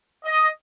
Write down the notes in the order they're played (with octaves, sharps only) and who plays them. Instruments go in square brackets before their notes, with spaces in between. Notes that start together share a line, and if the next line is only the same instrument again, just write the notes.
[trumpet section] D#5